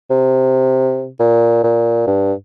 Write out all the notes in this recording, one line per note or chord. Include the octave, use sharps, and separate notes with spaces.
C3
A#2
A#2
G2